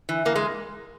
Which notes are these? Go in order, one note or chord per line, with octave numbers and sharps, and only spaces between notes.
E3
E3 A#3
G#3